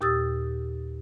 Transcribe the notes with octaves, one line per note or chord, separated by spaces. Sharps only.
D#2 A#2 G4 D#6 E6 A6